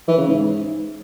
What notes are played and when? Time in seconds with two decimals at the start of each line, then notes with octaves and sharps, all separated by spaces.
0.08 E3
0.18 C#3
0.27 G#2